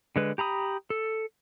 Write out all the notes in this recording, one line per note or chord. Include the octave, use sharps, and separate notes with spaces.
D3 G#3 B4
G4 A#5 B5 D#6
A4